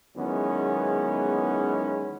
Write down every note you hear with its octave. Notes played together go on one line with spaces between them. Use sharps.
E2 D#3 F#3 G#3 B3 C#4